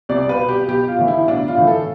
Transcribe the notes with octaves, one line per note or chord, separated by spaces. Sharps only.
C2 D5
B4
B2
G4
B1 G4
F4
A2 E3
E4
B1 D4
F4
A2 E3
A4